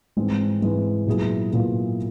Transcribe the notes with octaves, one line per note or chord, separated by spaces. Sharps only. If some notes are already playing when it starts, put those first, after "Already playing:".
G#2 E3 G#3 C4
G#2 E3 G#3 C4
A#2 F#3 B3 E4 G#4
A#2 F#3 B3 E4 G#4